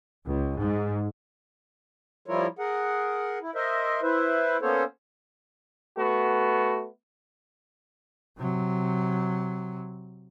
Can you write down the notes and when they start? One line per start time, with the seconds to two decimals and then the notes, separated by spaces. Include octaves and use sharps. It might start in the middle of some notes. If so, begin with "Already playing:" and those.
0.24 C#2
0.60 G#2
2.26 F3 G3 E4 F4 A#4 C#5
2.59 G#4 A#4 F#5
3.42 E4
3.55 A#4 C5 D#5 E5
4.03 E4 B4 C5 E5
4.62 A#3 B3 C#4 A4 C5 C#5
5.97 A3 B3 F#4
8.38 C3 F#3